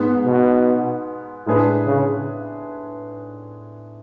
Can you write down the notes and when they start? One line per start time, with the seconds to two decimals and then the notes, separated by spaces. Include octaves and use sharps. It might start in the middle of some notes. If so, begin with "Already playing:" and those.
Already playing: G#2 G#3 B3
0.26 B2
1.46 A2 G#3 D4 G#4 B4
1.86 C#3